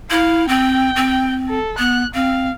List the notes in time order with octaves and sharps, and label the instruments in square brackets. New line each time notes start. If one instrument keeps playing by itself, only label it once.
[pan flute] E4 [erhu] F5
[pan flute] C4 [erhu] G5
[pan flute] C4
[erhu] A4
[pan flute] B3 [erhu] F#6
[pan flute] C4 [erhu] F5